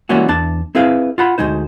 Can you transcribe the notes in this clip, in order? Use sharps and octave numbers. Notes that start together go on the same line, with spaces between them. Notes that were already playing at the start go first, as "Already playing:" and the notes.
E3 G3 G#3 A#3 C#4 F#4
E2 D4 A5
C4 E4 G#4 B4 F5
F4 F#5 B5
D2 G#3 D#4 C5